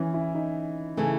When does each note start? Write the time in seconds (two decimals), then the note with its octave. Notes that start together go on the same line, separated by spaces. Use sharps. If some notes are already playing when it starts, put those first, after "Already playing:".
Already playing: E3 C#4
0.14 E4
0.34 D#4
0.97 C#3 E3 A3